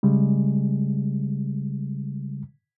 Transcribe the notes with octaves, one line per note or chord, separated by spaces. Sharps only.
C#3 G3 G#3